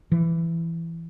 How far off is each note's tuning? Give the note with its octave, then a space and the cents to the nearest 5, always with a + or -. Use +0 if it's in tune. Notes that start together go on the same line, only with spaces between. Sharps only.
E3 +15